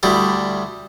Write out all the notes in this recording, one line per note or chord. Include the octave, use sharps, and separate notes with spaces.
D2 G3 E4